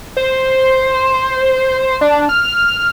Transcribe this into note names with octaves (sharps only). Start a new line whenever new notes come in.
C5
D4
F6